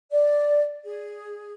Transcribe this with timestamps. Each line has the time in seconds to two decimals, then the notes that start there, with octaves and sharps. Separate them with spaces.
0.11 D5
0.84 G#4